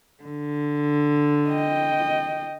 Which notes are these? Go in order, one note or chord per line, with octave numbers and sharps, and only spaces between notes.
D3
D#5 G5